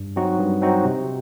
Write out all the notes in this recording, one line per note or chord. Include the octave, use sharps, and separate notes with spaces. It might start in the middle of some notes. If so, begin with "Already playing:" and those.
Already playing: G2
F#3 C4 D#4 F#4
G2
F#3 C4 D#4 F#4
C3